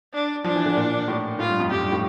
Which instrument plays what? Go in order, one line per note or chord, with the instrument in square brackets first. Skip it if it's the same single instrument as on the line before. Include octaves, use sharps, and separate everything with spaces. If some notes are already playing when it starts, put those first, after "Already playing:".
[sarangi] D4
[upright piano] F3 [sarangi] D4
[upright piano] E3
D3
A#2
A2
[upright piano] A2 [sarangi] F4
[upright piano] G2
F2
[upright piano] F2 [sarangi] G4
[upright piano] G2
A2